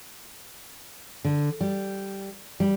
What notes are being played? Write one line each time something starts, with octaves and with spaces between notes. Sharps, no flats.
D3
G3
G3